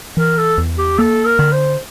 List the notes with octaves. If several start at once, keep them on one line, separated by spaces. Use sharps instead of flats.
E3 A#4
A4
E2
G4
A#3 A4
A#4
D3
C5